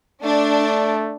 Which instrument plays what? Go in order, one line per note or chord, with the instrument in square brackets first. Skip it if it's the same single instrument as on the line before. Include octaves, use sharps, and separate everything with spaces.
[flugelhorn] A3 [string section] D4